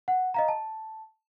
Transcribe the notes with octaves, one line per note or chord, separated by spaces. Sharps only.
F#5
D#5 F5 A#5
A5